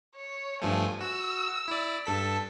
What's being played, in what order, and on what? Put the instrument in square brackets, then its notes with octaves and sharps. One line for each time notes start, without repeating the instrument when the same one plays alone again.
[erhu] C#5
[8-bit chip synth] G2 F3 A3 [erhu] G#5
[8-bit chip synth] F#4 [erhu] E6
[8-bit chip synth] E4 D5
[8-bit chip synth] G2 A4 B6 [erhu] A5